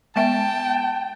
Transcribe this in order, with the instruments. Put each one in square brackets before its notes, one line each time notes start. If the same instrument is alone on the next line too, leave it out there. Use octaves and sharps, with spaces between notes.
[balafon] G#3 B3 E5 [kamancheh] G5 [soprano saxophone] A5